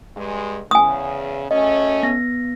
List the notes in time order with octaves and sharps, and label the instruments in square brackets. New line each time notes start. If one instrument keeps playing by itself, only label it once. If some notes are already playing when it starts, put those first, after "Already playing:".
[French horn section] G2 G#3
[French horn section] E2 C#3 [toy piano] G#5 D#6
[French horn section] F#2 A3 C#4 [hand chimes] D#5
[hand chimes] B3 A#6